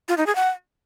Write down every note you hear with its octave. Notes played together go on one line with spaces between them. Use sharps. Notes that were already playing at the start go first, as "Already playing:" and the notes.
F4
D#4
G#4
F#5